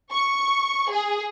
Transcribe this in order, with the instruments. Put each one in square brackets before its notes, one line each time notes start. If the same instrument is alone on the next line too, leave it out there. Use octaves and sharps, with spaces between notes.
[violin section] C#6
G#4